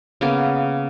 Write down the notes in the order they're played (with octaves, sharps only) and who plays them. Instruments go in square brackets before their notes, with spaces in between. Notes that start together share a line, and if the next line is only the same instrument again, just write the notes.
[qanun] C#3 A#3 B3